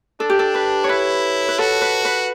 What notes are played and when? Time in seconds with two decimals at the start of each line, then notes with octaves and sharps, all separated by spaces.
0.20 D4 A4
0.30 G4
0.39 A4
0.55 B4
0.84 C#5
0.89 E4 B4
1.48 B4
1.59 F#4 A4
1.81 B4
2.05 B4